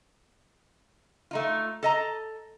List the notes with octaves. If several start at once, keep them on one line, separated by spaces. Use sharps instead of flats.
A3 D#4 F4
A4 D#5 A#5